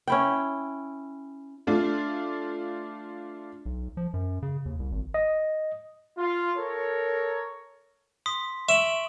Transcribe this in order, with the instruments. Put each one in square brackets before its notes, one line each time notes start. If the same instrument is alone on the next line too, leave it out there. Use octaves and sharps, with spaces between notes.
[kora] C#4 E4 G5
[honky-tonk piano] A3 D4 F4
[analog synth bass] B1
F3
F#2
C#3
D#2
C2
G#1
[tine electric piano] D#5
[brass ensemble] F4
A4 A#4 C#5
[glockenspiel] C6 D#6 B6
[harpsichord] E5 [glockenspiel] C#6 D7 F#7